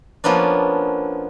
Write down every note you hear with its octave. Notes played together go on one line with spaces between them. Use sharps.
F3 A#3 B3 C#4 D4